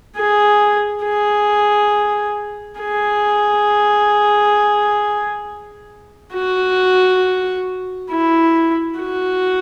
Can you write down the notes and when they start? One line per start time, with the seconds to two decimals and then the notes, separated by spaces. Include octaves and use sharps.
0.17 G#4
1.04 G#4
2.81 G#4
6.34 F#4
8.11 E4
8.99 F#4